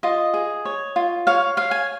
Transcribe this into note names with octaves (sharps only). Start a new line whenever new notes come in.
F4 D#5
G#4
C#5
F4
C#5 F5
C#5 F5
G#5